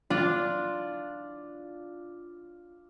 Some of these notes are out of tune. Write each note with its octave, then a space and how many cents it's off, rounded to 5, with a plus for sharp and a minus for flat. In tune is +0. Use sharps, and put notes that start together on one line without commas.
D4 +0 F4 +0